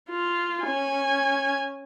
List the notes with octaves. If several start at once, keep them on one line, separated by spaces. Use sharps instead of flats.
F4
C#4 G#5